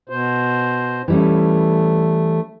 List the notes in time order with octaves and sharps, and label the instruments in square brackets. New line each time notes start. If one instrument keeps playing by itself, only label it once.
[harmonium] B2 C5
[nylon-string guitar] E3 G3 C#4 [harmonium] A3